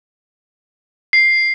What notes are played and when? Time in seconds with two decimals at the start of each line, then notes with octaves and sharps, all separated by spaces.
1.13 C7